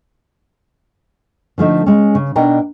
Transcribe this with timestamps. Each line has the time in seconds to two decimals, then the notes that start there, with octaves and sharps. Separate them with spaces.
1.58 D3 F3 A3 D#4
1.86 G#3 C#4
2.15 C#3
2.36 B2 D4 D#4 A#4 G5